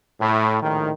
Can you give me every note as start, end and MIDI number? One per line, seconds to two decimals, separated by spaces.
0.20 0.61 45
0.62 0.90 34
0.62 0.90 45
0.62 0.90 51